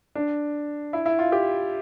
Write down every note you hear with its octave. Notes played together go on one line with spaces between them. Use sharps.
D4
E4
E4
F4
G4